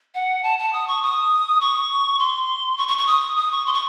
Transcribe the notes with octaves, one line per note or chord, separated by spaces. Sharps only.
F#5
A5
A5
D#6
C#6
D#6
C#6
C6
C#6
C#6
C#6
D#6
D#6
C#6
C6
C#6